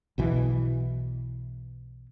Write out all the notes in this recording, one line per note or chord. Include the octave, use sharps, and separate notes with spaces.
B1 B2 E3